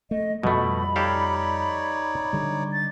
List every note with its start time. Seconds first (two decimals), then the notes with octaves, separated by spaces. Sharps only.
0.11 A3 D#5
0.43 F2 B2 F3 G3 A3 B5
0.96 D#4 G4 A4 C#5 D5 F5
2.33 D3 G3
2.73 A6